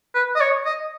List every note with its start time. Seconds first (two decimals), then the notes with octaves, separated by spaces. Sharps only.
0.15 B4
0.35 D#5
0.40 C#5
0.65 D#5